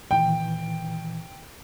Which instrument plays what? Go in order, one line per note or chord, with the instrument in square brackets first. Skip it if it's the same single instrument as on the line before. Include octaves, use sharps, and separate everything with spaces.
[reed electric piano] A#2 D#3 E3 [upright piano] G5